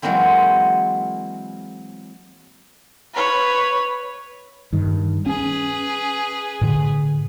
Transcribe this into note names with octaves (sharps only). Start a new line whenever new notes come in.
E3 F#3 G#3 A#3 C4 E4
B4 C#5
G2 D#3
C#4 G#4 B4
A2 D3